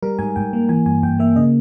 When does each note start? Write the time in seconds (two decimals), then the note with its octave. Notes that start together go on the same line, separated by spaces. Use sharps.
0.03 G3 A#4
0.19 G#2 G#5
0.36 G#2 G5
0.53 A#3
0.69 E3 G#5
0.86 G2 G#5
1.03 G2 G5
1.19 A#3 E5
1.36 C#3 D#5